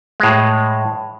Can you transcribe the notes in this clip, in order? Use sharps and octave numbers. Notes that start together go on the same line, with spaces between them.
A2 G#3